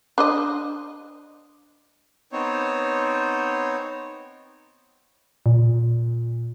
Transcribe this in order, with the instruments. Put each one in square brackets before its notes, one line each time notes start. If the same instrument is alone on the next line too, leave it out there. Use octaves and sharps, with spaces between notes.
[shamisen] D4 C5 D#5
[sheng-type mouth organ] B3 C4 D#4 C5 C#5
[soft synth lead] A#2